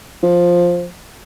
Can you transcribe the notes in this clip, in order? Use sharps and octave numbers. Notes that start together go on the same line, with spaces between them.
F3